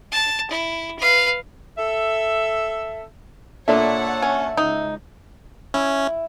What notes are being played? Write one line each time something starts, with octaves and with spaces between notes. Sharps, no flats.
A5
E4
B4 F5
A4 E5
A#2 D4 A4 C#5 E5 F#5 A5
C#4
C#2 D#4
C#4 E4